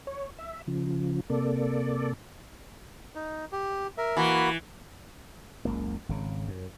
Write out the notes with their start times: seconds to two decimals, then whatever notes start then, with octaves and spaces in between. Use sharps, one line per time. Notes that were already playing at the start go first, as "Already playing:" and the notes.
0.07 C#5
0.38 E5
0.67 C#3 F3
1.30 C3 A#3 A4 D5
3.15 D#4
3.52 G4
3.98 A#4 E5
4.17 E3 A#3 F#4 B5
5.65 F#1 C#2 A#3
6.09 G#1 C#3
6.48 F#2